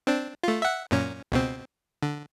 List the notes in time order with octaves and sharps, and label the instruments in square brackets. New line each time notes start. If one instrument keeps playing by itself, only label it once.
[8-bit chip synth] C4 D4
A3 F4
E5 F#5
F#2 A#2 C#4
C#2 B2 C4
D3